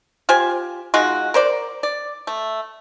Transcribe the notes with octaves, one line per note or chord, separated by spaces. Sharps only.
F4 G4 C5 G#5
G#3 D#4 F4 F#4
A#4 C5 D5
D5
A3